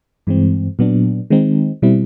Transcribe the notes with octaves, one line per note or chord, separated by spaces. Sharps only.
G2 E3 G#3 C4
A#2 F#3 B3 D4
D#3 G#3 C4 D#4
B2 G3 C4 E4